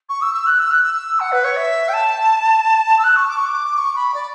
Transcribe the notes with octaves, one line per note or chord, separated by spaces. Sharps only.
C#6
E6
E6
F#6
E6
F#6
E6
F#5
B4
C#5
E5
G5
A5
E6
F#6
C#6
D6
C#6
D6
C#6
B5
D5